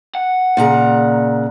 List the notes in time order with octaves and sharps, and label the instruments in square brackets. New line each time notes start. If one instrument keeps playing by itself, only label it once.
[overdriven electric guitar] F#5
[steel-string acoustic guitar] A#2 C#3 A#5